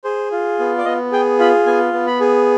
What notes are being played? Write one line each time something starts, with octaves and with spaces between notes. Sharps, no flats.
G#4 C5
F4
B3
D5
B3 D#5
G#4 G5
F4 B5
B3 G#5
B3
B5
G#4